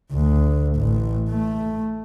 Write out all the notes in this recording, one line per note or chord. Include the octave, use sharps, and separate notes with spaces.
D2
A1
A3